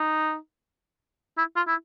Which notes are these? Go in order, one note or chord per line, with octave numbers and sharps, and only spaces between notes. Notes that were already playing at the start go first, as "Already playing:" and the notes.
Already playing: D#4
E4
F4
E4